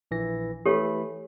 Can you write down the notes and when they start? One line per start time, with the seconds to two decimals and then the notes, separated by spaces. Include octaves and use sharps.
0.11 A#1 E3 A#6
0.66 E3 A3 G4 A4 C#5 B5